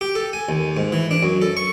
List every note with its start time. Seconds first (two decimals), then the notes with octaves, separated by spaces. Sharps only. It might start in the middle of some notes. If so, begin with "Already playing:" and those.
0.01 G4
0.15 A4
0.33 G#5
0.49 D#2
0.77 G#2
0.92 E3
1.11 D4
1.23 F#2
1.41 A4
1.57 C#6